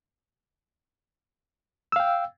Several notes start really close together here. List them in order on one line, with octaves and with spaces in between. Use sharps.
E6 F5 G5